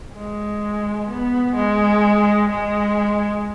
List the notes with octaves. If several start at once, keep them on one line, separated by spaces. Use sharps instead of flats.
G#3
B3
G#3
G#3